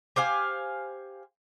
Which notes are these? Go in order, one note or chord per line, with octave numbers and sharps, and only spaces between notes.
G4 C5 F5 G#5